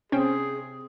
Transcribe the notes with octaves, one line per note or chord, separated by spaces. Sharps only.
C3 C4 C#4 G#4 C5 G5